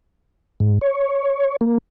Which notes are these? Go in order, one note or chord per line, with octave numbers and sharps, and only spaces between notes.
G#2
C#5
A#3